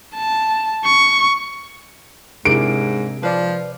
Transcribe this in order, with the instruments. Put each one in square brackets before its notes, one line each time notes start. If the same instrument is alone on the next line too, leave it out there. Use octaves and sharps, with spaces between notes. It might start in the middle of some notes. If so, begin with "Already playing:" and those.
[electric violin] A5
C#6
[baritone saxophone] G#2 [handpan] C3 G#4 A#4 [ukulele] D4 E4 [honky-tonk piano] D7
[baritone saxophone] F3 [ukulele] B4 D5